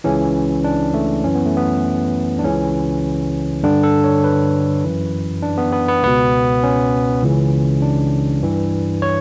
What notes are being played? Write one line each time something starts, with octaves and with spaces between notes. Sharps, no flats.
C#2 C#3 E3 C#4
D4
A3
F#2 E3 C#4
B3
A3
B3
D4
C#2 C#3 E3 C#4
G2 D3 D4
A4
C#5
B4
F#2 E3
D4
B3
B3
B3
C#2 B2 B3
C#4
C#2 C#3 E3
D4
G2 E3
C#5